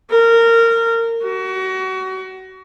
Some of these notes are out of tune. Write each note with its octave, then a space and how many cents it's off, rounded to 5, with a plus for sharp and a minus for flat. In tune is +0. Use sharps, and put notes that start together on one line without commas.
A#4 -20
F#4 +30